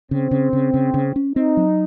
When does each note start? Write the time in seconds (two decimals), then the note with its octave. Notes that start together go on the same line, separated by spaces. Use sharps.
0.11 C#3 C4
0.31 C#3
0.53 C#3
0.74 C#3
0.94 C#3
1.16 C#4
1.36 C4 D#4
1.57 F#3